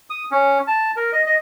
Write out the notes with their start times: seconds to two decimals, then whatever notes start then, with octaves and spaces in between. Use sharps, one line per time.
0.10 D#6
0.32 C#4
0.68 A5
0.97 A#4
1.13 D#5
1.26 D#5